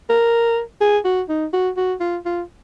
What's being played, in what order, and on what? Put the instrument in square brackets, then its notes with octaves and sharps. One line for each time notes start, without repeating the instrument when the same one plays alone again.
[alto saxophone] A#4
G#4
F#4
D#4
F#4
F#4
F4
F4